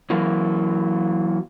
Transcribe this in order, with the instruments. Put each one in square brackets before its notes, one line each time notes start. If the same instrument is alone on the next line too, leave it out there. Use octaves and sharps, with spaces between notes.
[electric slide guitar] E3 F#3 A#3